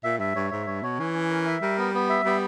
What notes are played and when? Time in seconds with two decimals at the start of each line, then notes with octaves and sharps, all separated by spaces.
0.04 A#2 E5
0.20 G2 E5
0.35 G2 C#5
0.51 G#2 E5
0.67 G2 C#5
0.83 B2 C#5
0.99 E3 C#4
1.15 C#4
1.30 A#4
1.46 E5
1.62 G3 A#4
1.78 B3
1.94 B3
2.09 E5
2.25 G3 B3